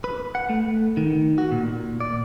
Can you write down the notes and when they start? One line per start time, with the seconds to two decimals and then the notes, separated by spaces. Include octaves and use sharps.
0.04 B4
0.35 F#5
0.49 A3
0.97 D#3
1.38 F#4
1.52 A#2
2.00 D5